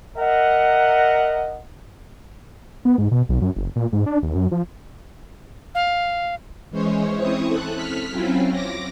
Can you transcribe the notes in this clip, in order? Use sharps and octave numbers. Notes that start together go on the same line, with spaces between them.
A#4 D#5 E5 F#5
B3
G#2
B2
B1
F#2
F#1
A#2
G#2
D4
D#2
F#2
F3
F5
E3 G#3 C#4 C5 C#5
C4 E4 C#6 D#6
A4 F#6
F6 B6
F#3 C4 C#4 E4 F4
D6 A#6